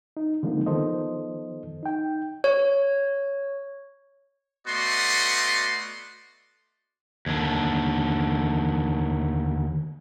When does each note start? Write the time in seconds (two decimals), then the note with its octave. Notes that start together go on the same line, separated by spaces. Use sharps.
0.17 D#4
0.43 D3 F3 G#3 A#3 C4 D#4
0.66 D#3 F3 B3 A4 C5 D#5
1.83 D#4 G5
2.44 C#5
4.68 A3 B3 F#4 D5 D#5 C6
7.26 D#2 D3